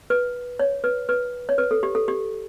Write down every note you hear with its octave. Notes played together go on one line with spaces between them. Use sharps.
B4
C#5
B4
B4
C#5
B4
A4
G4
A4
G4